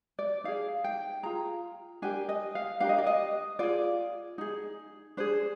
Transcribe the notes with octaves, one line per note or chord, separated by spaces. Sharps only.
D5
D#4 G#4 F5
G5
F4 G#4 A#5
D4 G4 A#4 G#5
D#5
F5
D4 G4 A#4 F5
D#5
D5
D#5
F4 G#4 D5
D#4 G#4
D4 G#4 C5